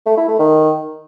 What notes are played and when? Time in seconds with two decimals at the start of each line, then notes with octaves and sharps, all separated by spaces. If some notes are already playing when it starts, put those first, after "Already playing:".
0.06 A3
0.17 E4
0.28 A3
0.39 D#3